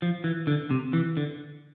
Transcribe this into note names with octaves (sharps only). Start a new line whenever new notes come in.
F3
E3
D3
C3
E3
D3